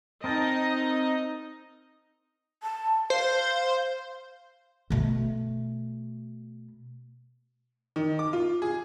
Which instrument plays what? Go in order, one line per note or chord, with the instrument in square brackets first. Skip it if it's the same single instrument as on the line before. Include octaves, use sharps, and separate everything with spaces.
[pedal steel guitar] C4 A#4 A5 [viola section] D#4 D#5
[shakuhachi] A5
[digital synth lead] C5 [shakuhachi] F5
[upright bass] B2 A3
[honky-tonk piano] D#3
D6
F4
G#4